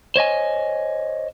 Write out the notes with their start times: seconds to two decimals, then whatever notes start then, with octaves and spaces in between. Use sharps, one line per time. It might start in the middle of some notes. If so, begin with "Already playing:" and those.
0.16 C5 C#5 D#5 G#5